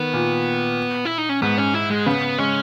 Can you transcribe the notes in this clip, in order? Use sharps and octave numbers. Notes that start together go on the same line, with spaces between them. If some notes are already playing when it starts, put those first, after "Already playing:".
Already playing: D#3 B3
A#2
E4
D#4
C#4
G#2 B3
C#4
E4
G#3
C#3 B3
G#3 C#4